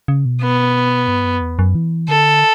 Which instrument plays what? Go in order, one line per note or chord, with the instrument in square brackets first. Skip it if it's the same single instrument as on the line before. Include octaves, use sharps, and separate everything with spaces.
[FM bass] C#3
B2
[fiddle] B3
[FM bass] G2
F#2
E2
F#2
E3
[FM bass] D3 [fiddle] A4